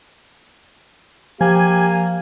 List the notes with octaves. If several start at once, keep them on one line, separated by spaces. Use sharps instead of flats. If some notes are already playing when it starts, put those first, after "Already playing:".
F3 A#3 G4 G#5